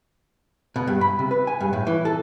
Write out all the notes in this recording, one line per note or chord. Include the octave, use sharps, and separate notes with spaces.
B2
G2
B5
C3
B4
G#5
G2
A2
E3
A4